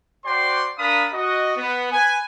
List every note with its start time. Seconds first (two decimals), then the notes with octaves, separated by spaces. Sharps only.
0.25 F#4 C5 D5 G5 C6
0.78 D4 A#4 F5 B5 D#6
1.12 F#4 D#5
1.57 B3
1.92 B4 G#5